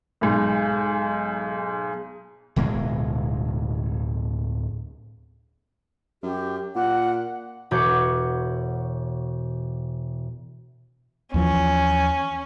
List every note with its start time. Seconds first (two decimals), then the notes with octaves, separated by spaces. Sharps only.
0.21 B1 G#2
2.56 D1 B2 G#3
6.23 F#2 G4
6.75 A#2 F#5
7.71 E1 B2 F#4 C#5 D6 G6
11.34 D#2 E3 F3 C#4